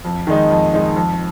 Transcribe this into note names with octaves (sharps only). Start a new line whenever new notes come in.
F2
D#3 G#3 D#4
F2
D#3 G#3 D#4
F2